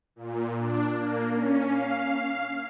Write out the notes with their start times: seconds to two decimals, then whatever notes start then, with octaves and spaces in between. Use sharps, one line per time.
0.16 A#2
0.58 D4
0.95 A#3
1.33 C#4
1.68 F5